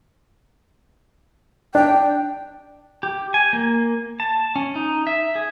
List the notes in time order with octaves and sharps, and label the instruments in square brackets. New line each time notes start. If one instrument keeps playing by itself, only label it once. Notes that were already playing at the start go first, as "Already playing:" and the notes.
[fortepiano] D4 [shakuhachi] G5
[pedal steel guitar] G4
G#5
A#3
A5
C#4
D#4
E5
G#4